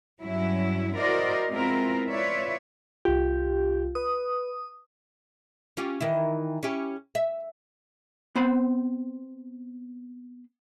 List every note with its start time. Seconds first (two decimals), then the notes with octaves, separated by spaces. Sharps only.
0.23 G2 F#3 C#4 E4
0.98 E4 F#4 A#4 C5 D5 D#5
1.50 G#3 B3 C4 E4 F4 A#4
2.10 E4 F4 B4 C#5 D5 E5
3.05 C2 F4 G4
3.95 B4 D#6
5.77 C#4 F4 G4
6.01 D#3 E3 E4
6.63 C#4 E4 G4
7.15 E5
8.36 B3 C4 C5 B5